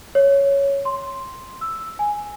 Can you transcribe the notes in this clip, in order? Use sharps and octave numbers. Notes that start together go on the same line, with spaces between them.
C#5
C6
E6
G#5